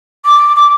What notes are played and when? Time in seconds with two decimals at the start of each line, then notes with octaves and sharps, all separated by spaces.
0.25 D6
0.56 D6